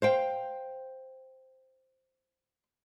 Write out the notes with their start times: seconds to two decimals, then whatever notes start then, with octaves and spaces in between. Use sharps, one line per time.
0.02 C5 F5 G5